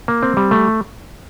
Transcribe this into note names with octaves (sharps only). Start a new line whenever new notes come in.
A#3
C4
G3
A3